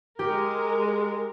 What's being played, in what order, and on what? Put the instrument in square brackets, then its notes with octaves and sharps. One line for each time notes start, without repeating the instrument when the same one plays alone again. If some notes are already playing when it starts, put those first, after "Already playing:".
[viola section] G#3 A#4 [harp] G4